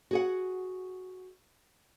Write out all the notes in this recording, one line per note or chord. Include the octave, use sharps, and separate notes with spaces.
F#4 G#4 F#5